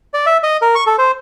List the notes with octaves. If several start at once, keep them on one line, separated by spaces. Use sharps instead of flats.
D5
E5
D#5
A#4
C#6
A4
C5